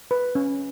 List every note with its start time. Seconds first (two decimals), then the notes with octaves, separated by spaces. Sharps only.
0.11 B4
0.35 C#4